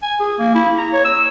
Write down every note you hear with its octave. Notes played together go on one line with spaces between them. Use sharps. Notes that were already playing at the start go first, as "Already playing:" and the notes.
G#5
G#4
A#3
E4
A#5
C#5
E6